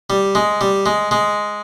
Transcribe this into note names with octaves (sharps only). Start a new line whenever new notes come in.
G3
G#3
G3
G#3
G#3